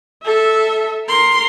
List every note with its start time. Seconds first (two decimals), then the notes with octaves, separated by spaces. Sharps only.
0.24 A4 E5
1.07 A#4 C6